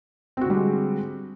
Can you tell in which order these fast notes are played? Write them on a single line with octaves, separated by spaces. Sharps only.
C4 F#4 D3 G3 G#3